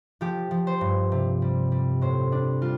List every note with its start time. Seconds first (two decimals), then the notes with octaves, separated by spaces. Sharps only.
0.21 F3 G4
0.51 F3
0.67 C5
0.81 G2
1.12 C3
1.42 G3
1.72 G3
2.01 A2 C5
2.32 G3 D4
2.62 G3 F4